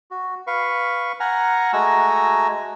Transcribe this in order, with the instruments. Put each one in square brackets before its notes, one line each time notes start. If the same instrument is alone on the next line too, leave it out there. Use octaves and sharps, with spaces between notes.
[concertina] F#4
B4 F5 C#6
F#5 G#5 A#5 F6
G#3 A3 F#4 G#5 A#5 E6